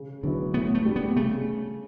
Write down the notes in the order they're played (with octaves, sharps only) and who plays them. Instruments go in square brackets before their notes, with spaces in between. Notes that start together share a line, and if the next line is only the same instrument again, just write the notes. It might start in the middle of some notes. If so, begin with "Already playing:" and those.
Already playing: [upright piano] C#3
[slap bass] D3 [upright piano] F#3 B3 E4 B4
[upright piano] A2 [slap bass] B3
[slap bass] A3
[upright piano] G3 D4 G4
[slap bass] B3
[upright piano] C#3 [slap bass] A3